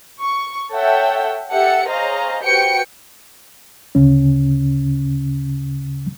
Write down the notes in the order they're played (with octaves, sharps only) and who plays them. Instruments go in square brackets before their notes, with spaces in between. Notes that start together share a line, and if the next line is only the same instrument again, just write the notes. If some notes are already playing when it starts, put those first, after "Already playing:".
[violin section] C#6
A4 C#5 E5 F#5 G5
G4 A4 E5 F#5 C#7
G#4 C5 C#5 D#5 F5 A#5
F#4 G4 B4 C5 G5 C#7
[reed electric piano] D2 C#3 C#4